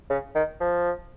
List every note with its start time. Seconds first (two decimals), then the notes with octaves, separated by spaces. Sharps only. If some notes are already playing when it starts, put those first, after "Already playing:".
0.10 C#3
0.35 D#3
0.60 F3